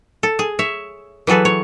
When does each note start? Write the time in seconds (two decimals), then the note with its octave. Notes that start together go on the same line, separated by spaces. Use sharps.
0.23 A4
0.39 G#4
0.59 C#5 E5
1.27 E3 F#3 G#4 A4 B4
1.45 C#5